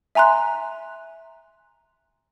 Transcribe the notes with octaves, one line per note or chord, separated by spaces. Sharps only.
E5 G#5 A#5 C6 F#6